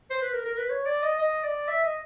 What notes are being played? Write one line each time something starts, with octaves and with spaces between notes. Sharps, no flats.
C5
B4
A#4
A#4
B4
C#5
D5
D#5
D#5
D5
E5
D#5